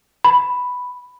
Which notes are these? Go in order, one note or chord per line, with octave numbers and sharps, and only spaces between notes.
B5